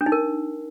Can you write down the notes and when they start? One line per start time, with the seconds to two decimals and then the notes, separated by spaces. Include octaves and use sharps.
0.01 D4
0.06 D#4
0.12 A#4